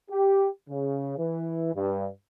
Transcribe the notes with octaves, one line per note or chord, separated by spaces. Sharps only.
G4
C#3
E3
G2